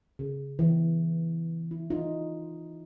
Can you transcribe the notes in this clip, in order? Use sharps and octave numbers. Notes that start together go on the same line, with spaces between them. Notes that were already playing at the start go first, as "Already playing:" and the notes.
C#3
E3
E4
D#4 F4